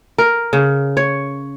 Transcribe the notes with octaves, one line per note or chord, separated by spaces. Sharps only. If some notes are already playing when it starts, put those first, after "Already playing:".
A#4
C#3
C#5